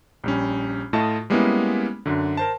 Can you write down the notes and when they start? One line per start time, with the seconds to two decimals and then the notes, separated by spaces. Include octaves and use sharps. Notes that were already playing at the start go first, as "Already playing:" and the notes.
0.24 A#1 G3 C#4
0.93 A2 A3 F4 D#5 A5
1.30 G3 G#3 A#3 B3 C#4 E4
2.06 F#2 D3
2.37 A#4 C5 A5